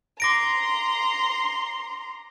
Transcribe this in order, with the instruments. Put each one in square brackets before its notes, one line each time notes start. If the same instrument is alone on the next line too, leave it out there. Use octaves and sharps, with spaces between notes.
[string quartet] A#5 C6 [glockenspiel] D6 A#6 D7